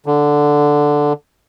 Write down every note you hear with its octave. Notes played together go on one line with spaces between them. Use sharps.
D3